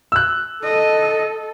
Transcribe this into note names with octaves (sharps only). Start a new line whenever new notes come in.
E6 F#6
A4 D#5